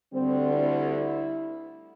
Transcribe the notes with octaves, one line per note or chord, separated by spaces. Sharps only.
D2 D3 G3 C4
E4